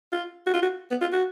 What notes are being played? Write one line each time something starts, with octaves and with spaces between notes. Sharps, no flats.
F4
F#4
F4
F#4
B3
F4
F#4